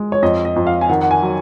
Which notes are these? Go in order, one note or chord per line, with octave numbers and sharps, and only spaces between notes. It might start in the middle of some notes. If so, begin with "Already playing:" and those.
Already playing: G#3
C#5
F2 D#5
D#5
F2
F5
G#5
D#3 F#5
F#5
G#5
F#3